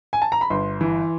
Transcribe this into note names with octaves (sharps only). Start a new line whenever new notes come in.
G#5
A5
A#5
B5
G1 C6
E3